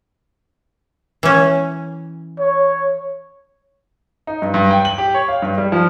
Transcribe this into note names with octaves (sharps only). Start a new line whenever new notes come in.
E3 C#4
C#5
D#4
G2
G2
G5
F#7
G4
C#5
F5
G2
G3
F3